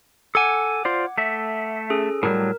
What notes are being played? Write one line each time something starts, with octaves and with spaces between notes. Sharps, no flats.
A4 F#5 G#5 D6 G#6
F4 C5 D5
A3 E5
C#4 G#4 A4
A2 F#3 G3 A#4